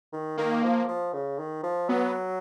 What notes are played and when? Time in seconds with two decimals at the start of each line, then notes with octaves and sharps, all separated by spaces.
0.13 D#3
0.37 D#3 A#3
0.63 F3
0.88 F3
1.13 C#3
1.38 D#3
1.63 F3
1.89 F#3 B3